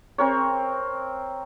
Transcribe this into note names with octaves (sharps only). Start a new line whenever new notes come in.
C4 A#4 C#5